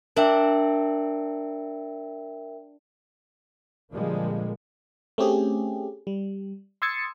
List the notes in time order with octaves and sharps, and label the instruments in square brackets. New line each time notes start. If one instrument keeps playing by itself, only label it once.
[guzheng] D4 [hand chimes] A#4 E5 G5
[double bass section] A#2 D3 F3 G3 G#3 A#3
[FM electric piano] A3 C4 C#4 G4 G#4
G3
C6 D#6 E6 G#6 A6 C#7